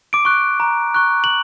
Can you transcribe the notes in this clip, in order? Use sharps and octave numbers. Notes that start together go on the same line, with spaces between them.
D6 D7
C#6 F#6
A#5
C#6 F#6
F#7